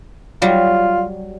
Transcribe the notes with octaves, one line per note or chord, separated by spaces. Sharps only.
F#3 G3 F4